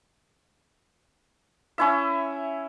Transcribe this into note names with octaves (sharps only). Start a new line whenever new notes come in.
C#4 E4 E5